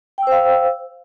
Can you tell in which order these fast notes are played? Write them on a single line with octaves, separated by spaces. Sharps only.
G5 E6 C5 F5